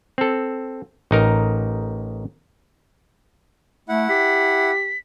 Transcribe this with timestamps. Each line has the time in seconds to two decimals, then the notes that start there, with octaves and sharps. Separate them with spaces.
0.18 C4 A4
1.11 A1 D#4 A#4
3.89 A3 E4 F#5
4.09 G4 B6